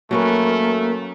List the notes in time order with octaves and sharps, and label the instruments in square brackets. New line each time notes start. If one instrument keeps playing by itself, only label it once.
[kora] F#3 C#4 B4 [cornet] A3 [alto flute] A#3